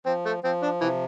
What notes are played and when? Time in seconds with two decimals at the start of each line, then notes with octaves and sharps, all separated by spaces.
0.06 F3 C4
0.26 A3
0.44 F3 C4
0.63 D4
0.81 C3 E3